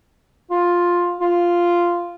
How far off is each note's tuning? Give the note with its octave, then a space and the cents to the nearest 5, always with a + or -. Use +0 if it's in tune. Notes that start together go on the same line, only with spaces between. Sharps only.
F4 +5
F4 -5